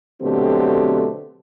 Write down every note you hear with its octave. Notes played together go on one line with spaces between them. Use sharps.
B2 D3 F#3 A3 C4 G4